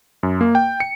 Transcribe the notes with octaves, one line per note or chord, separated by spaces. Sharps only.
F#2
A#3
G5
C#7